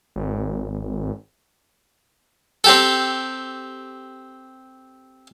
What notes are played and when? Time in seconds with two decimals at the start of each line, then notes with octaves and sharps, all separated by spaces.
0.16 G#1
2.64 C4 G4 A4